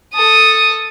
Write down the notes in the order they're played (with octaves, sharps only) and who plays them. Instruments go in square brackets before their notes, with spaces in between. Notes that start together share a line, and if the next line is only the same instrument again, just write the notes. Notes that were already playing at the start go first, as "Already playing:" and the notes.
[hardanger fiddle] A4 D#6